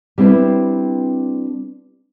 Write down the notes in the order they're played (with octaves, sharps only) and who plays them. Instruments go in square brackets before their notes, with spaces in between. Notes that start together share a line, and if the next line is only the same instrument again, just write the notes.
[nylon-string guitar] G3 C4 D4 E4 B4